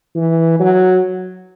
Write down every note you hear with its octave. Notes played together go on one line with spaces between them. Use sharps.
E3
F#3